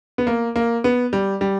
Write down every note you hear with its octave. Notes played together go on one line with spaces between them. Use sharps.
B3
A#3
A#3
B3
G3
G3